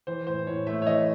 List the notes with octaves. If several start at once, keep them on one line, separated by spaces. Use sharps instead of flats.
E3 C5
A2 C5
A2 C#5
A3 E5
C#5
E3 D#5